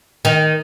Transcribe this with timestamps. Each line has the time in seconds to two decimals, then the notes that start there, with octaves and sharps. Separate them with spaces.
0.25 D#3